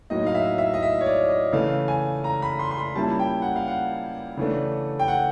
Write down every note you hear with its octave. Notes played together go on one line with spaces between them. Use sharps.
A2 F#3 A#3 D#4 D#5
F5
E5
E5
D#5
E5
C#5
D5
D#5
C#3 E3 A3 F5
G#5
A#5
B5
C6
C6
B5
A#2 G3 A#3 C#4 E4 A5
G5
F#5
F5
F#5
C#3 E3 A3 D4
G5
F#5